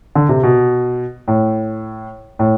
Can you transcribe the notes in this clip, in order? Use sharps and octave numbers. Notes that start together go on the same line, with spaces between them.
D3
C3
B2
A2
A2